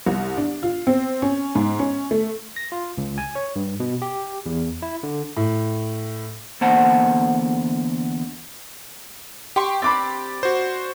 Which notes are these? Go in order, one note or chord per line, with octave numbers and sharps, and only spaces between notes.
C2
D4
F4
C4
C#4
G#2
C#4
A3
A#6
F4
C#2
G#5
C#5
G2
B2
G4
E2
E4
D3
A2
E2 D3 A#3 C5 F#5 A5
G4 G5 C6 C#6
C4 D4 B5 D6 A6
F#4 C5